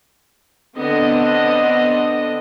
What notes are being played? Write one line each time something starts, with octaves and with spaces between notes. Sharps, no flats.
D3 B3 C4 D4 D#5